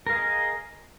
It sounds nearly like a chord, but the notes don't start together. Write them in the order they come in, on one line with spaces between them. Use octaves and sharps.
A#4 F5 G#4 D#5